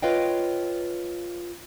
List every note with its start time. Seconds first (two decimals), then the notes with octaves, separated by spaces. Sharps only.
0.02 F4 B4 C#5 D#5 F5 G5